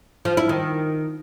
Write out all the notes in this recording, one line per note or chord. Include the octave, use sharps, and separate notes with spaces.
F3
E4
D#3